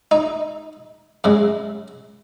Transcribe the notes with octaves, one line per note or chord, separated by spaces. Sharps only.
D#4
F#2 C#3 G#3